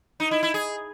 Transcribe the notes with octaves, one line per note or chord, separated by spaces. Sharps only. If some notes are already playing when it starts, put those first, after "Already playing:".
D#4
E4
E4
G#4